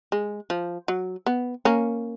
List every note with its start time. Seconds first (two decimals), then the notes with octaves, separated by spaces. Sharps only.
0.12 G#3
0.50 F3
0.88 F#3
1.26 B3
1.65 A#3 C#4